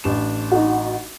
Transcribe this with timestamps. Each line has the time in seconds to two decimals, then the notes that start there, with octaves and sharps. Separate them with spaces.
0.04 A1 D4 E7
0.52 D#4 F#4